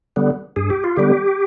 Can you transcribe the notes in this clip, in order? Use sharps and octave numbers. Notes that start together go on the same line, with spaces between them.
D3 G3 B3
G2 G#4
G4
F4
D3 G3 B3 G4